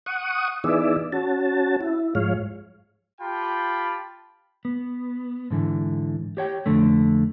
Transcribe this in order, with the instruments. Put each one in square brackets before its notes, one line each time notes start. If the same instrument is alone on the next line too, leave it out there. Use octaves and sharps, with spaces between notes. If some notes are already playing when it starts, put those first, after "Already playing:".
[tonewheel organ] F#5 C#6 D#6
E3 B3 D#4 G#4 D5 E5
C#4 F#4 A5
E4
G#2 F3 G#3 C#5 F5
[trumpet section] F4 G4 G5 A5 B5
[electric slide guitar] B3
G#2 D3 E3
G4 C#5 G5
F2 D3 A3